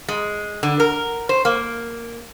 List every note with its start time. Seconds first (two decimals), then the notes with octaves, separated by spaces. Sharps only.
0.08 G#3
0.63 D3
0.80 A#4
1.29 C5
1.45 A#3